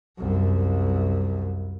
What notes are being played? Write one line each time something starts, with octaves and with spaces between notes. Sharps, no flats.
C2 F#2